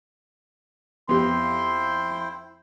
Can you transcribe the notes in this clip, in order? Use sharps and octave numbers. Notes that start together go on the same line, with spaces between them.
F2 B3 E4 G4 C5 G5 C6